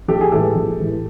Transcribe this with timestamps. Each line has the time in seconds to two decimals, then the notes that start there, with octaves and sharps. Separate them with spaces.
0.08 A#1 G4 A4
0.21 G#4
0.32 A2 E3 G#3 G4 A4
0.55 A#1
0.79 A2 E3 G#3